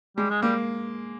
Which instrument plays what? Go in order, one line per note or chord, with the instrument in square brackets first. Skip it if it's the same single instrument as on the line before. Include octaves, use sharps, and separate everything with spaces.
[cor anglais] G3 [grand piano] G#3
[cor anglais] G#3
[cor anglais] G3 [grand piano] A#3